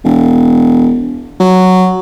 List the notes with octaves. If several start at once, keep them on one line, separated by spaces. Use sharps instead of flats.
E1
F#3